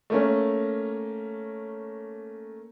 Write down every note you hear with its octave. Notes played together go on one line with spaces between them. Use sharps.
A3 A#3 C#4